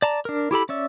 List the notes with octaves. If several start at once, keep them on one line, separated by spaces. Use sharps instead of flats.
D5 A5 A#5
D4 A#4
E4 G4 A4 B5
C#4 D5 E5